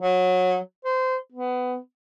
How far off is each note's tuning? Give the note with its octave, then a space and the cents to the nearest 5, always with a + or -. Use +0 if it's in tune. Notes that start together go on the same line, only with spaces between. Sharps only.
F#3 -20
C5 -20
B3 +20